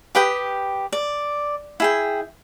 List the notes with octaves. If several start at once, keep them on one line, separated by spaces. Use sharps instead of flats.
G4 B4 G5 D#6
D5
E4 G#4 G5